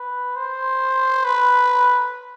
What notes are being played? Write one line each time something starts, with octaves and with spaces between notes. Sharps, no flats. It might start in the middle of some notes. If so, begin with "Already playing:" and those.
Already playing: B4
C5
B4